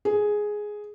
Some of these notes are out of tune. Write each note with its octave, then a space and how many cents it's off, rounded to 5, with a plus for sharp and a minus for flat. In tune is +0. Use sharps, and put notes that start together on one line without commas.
G#4 +5